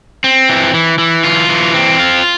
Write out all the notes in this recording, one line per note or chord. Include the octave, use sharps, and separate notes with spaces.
C4
E3
E3
E3
F4
E3
C4
F4